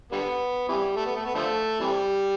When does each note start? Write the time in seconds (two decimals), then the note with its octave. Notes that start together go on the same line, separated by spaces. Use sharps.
0.12 D3 G3 B3
0.68 C3 E3 G3
0.96 A3
1.06 B3
1.15 A3
1.25 B3
1.35 D3 F3 A3
1.80 C3 E3 G3